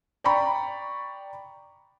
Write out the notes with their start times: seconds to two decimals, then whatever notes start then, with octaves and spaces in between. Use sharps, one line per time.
0.24 D5 G5 A#5 B5 C#6